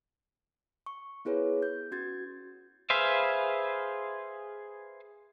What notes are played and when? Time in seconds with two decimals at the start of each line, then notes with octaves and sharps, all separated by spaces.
0.86 C#6
1.25 B3 E4 G#4 B4 C#5
1.62 G6
1.91 C#4 F#4 G#6 A6
2.90 G#4 B4 C5 E5 F5